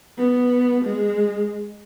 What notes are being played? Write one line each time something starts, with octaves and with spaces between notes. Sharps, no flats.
B3
G#3